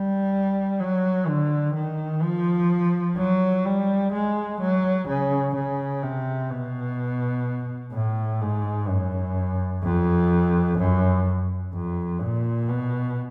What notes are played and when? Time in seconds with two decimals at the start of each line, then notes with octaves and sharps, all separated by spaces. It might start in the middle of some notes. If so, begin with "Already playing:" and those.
Already playing: G3
0.80 F#3
1.27 D3
1.75 D#3
2.23 F3
3.17 F#3
3.65 G3
4.12 G#3
4.61 F#3
5.08 C#3
5.55 C#3
6.03 C3
6.50 B2
7.93 A2
8.41 G#2
8.88 F#2
9.83 F2
10.78 F#2
11.74 F2
12.21 A#2
12.68 B2